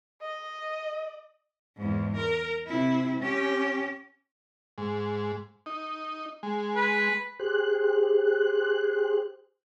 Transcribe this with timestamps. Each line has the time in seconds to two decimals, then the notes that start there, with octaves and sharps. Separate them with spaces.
0.22 D#5
1.77 E2 G#2
2.17 A#4
2.66 C3 E4
3.20 C#4 G4
4.78 G#2
5.66 D#4
6.43 G#3
6.76 B4
7.40 G4 G#4 C5 F#6